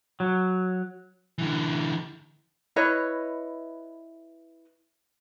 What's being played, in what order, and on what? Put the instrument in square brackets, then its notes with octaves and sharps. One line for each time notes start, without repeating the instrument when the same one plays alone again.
[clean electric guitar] F#3
[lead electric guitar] D3 E3
[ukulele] E4 B4 C#5 D#5